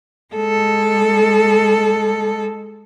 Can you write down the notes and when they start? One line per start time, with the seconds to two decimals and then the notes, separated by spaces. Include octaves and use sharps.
0.35 G#3 A4